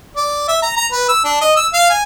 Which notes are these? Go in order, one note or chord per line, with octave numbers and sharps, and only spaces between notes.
D5
E5
A#5
A#5
B4
E6
D4
D#5
E6
F5
G#5